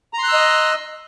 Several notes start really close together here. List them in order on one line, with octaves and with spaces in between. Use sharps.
A#5 C6 F#6 E6 D#5